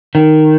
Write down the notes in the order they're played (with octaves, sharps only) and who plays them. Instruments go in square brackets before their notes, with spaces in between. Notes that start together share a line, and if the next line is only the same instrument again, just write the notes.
[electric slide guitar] D#3